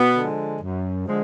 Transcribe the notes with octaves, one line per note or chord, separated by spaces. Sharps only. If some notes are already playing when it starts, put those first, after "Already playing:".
Already playing: B2 B3
D3 F3 G#3
F#2
D3 F3 G#3